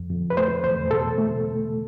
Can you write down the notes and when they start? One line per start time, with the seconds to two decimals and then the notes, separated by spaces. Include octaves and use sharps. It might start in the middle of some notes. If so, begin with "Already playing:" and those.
Already playing: F2
0.10 F2
0.30 B4
0.37 A3 C5
0.64 E2 C5
0.91 B2 A4
1.18 A3